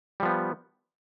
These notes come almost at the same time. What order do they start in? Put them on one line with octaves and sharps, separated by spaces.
G3 F3 B3